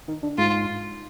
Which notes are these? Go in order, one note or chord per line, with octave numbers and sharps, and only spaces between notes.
D#3
D3
G#2 F4